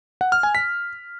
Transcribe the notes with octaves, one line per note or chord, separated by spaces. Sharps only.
F#5
F6
G#5
B6